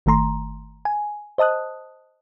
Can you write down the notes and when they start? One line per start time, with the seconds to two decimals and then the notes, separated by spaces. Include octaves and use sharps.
0.06 G1 D#3 A3 A#5 C6
0.85 G#5
1.38 C5 D#5 A5 D#6 F#6